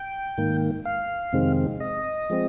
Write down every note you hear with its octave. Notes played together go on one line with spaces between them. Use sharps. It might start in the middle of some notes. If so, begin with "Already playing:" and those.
Already playing: G5
G#2 D#3 A#3
F5
F2 C3 D#3 G#3 C4
D#5
F3 G#3 C4